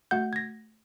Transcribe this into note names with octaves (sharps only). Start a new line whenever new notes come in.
A3 F#4 F#5 G6
G#6 A#6